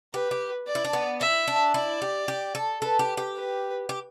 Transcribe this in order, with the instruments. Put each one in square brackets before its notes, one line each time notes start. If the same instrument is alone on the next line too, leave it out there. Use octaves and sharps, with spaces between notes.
[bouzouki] G4 [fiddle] B4
[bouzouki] G4
[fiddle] D5
[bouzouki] E4
D4
B3
[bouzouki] E4 [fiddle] E5
[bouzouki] D4
[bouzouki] E4 [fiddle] D5
[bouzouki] G4
G4
A4
[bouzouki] A4 [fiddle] B4
[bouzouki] G4
G4
[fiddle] B4
[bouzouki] G4